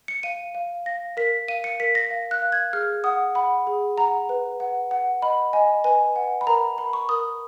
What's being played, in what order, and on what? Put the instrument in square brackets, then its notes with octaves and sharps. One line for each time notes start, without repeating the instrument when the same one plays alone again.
[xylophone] C#7
F5 D#7
F5
F5 A#6
A#4 B6
F5 D#7
C#7
A#4 B6
A#6
F5
F#6
F5
G#6
G#4 F6
F#5 D#6
F#5 B5
G#4
F#5 A#5
B4
F#5
F#5
D#5 B5
D#5 G#5
B4 G#5
F#5
B5
A#4 A#5
A#4 B5
C#6
A#4 D#6